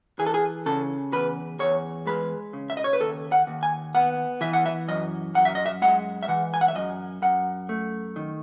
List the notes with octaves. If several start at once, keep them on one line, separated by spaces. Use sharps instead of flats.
E3 G#4
A4
G#4
C#3 A4
E2 B4
E2 C#5
G#3 B4
C#3
E5
D#5
C#5
B4
D#2 A4
F#5
D#2
G#5
B3 F#5
E3 E5
F#5
E5
F#2 D#5
F#2 F#5
E5
D#5
E5
G#3 F#5
E5
E3 F#5
G#5
F#5
E5
F#2 D#5
F#2 F#5
A3
D#3